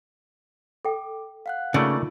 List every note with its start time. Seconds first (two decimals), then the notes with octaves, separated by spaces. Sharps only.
0.85 A4 G5 D6
1.46 F5 F#5 F#6
1.74 C#3 A3 A#3 D#4 F4 D5